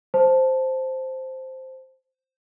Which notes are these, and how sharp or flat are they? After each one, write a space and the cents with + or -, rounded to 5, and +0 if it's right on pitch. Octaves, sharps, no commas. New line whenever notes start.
C5 +0 A5 +0